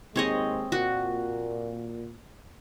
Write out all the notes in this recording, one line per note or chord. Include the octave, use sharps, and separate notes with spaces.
D#2 G#2 G#3 C4 C#5 D#5
A#2 F#4